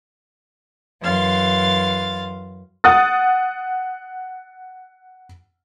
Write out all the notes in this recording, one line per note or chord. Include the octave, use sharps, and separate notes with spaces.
F#2 E3 F5 C6 A6
F#5 D#6 A6